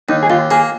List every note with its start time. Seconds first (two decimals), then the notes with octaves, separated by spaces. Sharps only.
0.09 D#2 D#4
0.23 G#4
0.30 D#2 F4
0.51 A#3 G#4